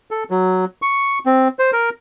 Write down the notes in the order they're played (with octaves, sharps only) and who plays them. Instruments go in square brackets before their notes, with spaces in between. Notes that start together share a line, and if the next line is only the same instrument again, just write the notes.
[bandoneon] A4
F#3
C#6
C4
C5
A#4